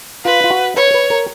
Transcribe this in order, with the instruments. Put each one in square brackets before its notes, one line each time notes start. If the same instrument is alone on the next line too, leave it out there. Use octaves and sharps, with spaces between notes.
[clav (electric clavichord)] F4 [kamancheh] B4
[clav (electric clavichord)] F4
F#4
[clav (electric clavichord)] B4 [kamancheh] C#5
[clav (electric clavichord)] B4
A#4